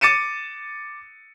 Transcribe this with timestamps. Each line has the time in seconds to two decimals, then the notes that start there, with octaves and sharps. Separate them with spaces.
0.01 D6 A6 C#7 D#7 E7